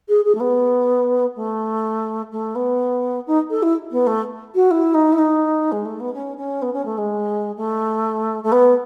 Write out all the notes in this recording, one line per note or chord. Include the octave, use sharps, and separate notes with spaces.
G#4
G#4
A3
B3
A3
A3
B3
D#4
A4
E4
B3
A3
F#4
E4
D#4
E4
D#4
G#3
A3
B3
C#4
C#4
B3
C#4
A3
G#3
A3
A3
B3